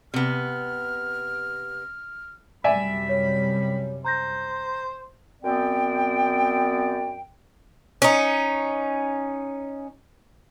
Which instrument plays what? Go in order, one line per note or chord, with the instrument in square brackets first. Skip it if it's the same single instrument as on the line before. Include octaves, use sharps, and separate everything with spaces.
[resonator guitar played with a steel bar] C3 B3 [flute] F6
[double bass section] F#2 C3 G3 [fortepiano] D5 E5 G#5 [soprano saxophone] B5
[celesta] C#5
[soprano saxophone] C5 [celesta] A#5 G6 A#6
[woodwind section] F#2 B3 C4 D5 G5
[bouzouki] C#4 D#4